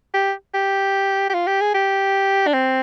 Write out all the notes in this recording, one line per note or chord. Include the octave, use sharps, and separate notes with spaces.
G4
G4
G4
F4
G4
G#4
G4
D4
C4